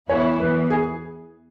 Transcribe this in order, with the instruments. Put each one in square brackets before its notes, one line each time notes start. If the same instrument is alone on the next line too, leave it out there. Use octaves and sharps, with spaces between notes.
[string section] E2 E3 B3 E4 [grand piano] C#5
[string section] E2 E3 B3 [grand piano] B4
[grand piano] G#4